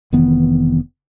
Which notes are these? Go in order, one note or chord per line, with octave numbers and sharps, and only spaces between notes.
F1 D#3 E3 B3